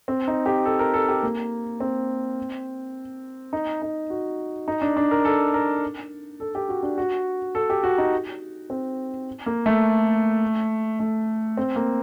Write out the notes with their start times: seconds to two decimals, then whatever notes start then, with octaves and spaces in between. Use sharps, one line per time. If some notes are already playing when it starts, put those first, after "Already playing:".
0.08 C4
0.28 D#4
0.46 G4
0.65 A4
0.79 A#4
0.94 A4
1.08 G4
1.23 A#3
1.80 C4
3.53 D#4
3.82 D#4
4.10 F#4
4.68 D#4
4.82 D4
4.97 D4
5.11 A#4
5.25 A4
5.54 A#4
6.40 A4
6.55 G4
6.69 F#4
6.83 D4
6.98 F#4
7.55 A4
7.70 G4
7.83 F#4
7.98 D#4
8.70 C4
9.46 A#3
9.66 A3
11.00 A3
11.57 C4
11.76 A#3